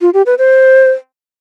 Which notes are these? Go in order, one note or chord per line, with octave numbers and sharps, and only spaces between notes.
F4
G4
B4
C5